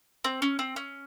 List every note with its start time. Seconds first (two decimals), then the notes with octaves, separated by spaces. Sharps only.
0.24 C4
0.42 C#4
0.59 C4
0.76 C#4